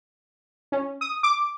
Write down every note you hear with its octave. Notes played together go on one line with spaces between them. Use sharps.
C#4
D#6
D6